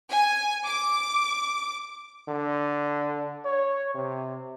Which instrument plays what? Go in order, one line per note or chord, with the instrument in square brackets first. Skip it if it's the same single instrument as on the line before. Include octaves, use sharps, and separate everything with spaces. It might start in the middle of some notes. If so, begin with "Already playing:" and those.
[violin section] G#5
D6
[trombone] D3
C#5
C3